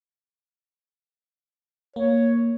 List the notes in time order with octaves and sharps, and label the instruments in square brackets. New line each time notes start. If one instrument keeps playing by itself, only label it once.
[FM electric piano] A#3 [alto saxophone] C#5